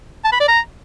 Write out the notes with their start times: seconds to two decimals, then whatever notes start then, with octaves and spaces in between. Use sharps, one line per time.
0.25 A5
0.32 B5
0.40 D5
0.48 A#5